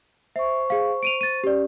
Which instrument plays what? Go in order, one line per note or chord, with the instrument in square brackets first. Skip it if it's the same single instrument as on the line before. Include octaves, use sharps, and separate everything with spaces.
[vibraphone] C5 C#6 [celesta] E5
[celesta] G#4 F5
D7 D#7 F7
A6 D#7
[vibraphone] C#4 [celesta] G4 D5